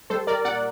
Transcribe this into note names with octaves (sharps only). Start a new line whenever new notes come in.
G3 A4 C5
G3 A#4 D5
A#2 D5 F#5